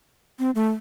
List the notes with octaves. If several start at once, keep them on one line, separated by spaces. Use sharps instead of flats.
C4
A3